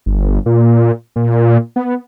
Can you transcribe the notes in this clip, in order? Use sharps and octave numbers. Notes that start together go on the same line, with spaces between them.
G1
A#2
A#2
B3